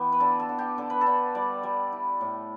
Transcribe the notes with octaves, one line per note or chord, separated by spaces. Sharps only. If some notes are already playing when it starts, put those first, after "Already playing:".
Already playing: E3 B3 G4
B4
D3 A4
A4
D3
G4
D3 A4
B4
A4
D3
G3 D5
G3
E4
A2